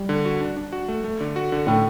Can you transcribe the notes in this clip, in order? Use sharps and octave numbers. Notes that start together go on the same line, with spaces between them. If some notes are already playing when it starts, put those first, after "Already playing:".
Already playing: G3
D3
F#4
D4
D4
F#4
A3
A3
D3
F#4
D3
A2 A3